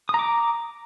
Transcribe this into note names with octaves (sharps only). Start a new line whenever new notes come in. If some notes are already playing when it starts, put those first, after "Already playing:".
A#5 D6 D#6